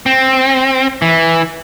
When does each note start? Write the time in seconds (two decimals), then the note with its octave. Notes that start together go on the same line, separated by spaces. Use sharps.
0.06 C4
1.02 E3